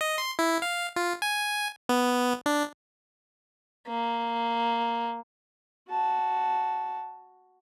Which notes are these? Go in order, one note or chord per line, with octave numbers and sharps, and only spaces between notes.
D#5
C6
E4
F5
F4
G#5
B3
D4
A#3
F#4 A5